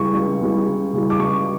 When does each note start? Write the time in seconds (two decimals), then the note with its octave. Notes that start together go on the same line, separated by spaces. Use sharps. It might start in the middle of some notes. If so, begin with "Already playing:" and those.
Already playing: C#2 C#3 E3 G3 C#6
0.15 C#2
0.41 C#3 E3 G3
0.67 C#2
0.93 C#3 E3 G3
1.10 D6
1.19 C#2 C#6